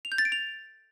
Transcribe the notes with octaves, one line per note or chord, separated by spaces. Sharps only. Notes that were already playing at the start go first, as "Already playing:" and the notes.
F7
G6
A6
D7
F7